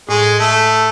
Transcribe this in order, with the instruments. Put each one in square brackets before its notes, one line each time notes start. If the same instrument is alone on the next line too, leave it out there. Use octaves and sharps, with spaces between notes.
[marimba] A2 [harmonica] G#3
[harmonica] A3